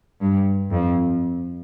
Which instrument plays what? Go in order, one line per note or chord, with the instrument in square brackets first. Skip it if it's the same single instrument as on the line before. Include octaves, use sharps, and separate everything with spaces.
[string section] G2
F2